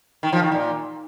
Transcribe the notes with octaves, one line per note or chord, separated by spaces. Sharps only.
D#3
F3
D#3
A#2